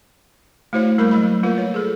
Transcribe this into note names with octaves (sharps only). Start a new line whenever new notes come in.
A3 E4 F#4 C5 C#5 F5
G3 A3 A#3 A#4 B5 C#6
F#3 B5
A#3 F4 A#4 B4
C#5
G#4 A4